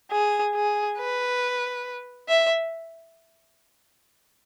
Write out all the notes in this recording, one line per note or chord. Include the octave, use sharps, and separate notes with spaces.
G#4
G#4
B4
E5